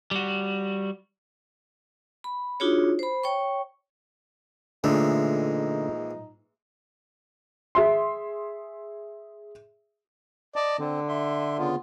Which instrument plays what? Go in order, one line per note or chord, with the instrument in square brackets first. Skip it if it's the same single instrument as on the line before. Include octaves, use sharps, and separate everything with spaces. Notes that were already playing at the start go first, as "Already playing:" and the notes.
[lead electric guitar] G3 F#4
[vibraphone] B5
D4 D#4 F4 F#4 G#4 C#5
C5 B5
C#5 G5 C#6
[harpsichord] A#1 E3 G#3 [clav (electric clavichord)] D3 A3 [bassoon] D#4
[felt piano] G#4 E5 C6
[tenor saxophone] D5 [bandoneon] D#5 A5
[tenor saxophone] D3 [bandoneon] C4
[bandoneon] E5 C6
C#3 B3 F4